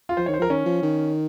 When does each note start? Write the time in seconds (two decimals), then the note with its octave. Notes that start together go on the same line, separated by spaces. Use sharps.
0.09 F4
0.17 F3 C5
0.26 D#3 C#5
0.34 C5
0.39 F3 A#4
0.50 D#3 C#4
0.66 F3
0.83 D#3